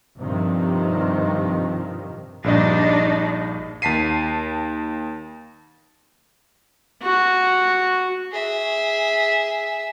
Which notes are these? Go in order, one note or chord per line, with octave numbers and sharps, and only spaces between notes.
G2 C3 D#3 F3
A#1 G2 D4 D#4 D#5
D#2 A5 B6 C7 D#7
F#4
G#4 E5